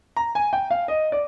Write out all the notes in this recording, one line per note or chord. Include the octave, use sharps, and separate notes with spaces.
A#5
G#5
G5
F5
D#5
D5